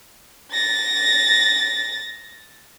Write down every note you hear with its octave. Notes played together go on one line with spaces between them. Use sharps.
A6 A#6